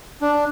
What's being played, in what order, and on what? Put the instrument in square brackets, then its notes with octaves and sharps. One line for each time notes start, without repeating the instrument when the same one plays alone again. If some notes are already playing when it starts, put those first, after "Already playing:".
[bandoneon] D4